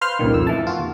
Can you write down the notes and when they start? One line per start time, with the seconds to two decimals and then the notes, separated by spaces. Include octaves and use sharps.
0.01 B4 C5 F5 C6 F6
0.19 C#2 G2 A#2 D#3
0.33 F2 E6
0.47 A2 E3 A5
0.67 F4 F#4
0.79 D#2